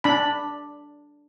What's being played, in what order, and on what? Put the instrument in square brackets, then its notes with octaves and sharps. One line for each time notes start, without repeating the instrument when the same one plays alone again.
[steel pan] D4 B5